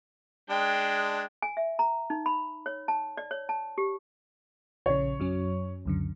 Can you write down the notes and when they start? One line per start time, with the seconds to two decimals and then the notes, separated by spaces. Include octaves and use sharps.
0.50 G#3 D4 G5
1.42 G#5
1.57 E5
1.79 A#5
2.10 D#4
2.26 B5
2.66 C#5
2.88 A5
3.17 D5
3.31 C#5
3.49 A5
3.78 G4
4.86 A#1 C#3 C#5
5.20 F#2 F#3 C#4
5.85 C#2 F#2 D3